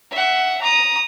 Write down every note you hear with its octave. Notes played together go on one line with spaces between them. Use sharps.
E5 F#5
A#5 D#6